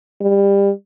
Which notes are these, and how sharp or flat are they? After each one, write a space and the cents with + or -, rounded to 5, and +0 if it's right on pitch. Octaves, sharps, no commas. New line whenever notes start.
G3 +25